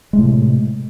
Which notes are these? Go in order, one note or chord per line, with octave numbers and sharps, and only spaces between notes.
A2 C3 G#3 A3